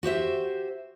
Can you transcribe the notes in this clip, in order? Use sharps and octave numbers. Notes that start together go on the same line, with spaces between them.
F#4 G4 C5 E5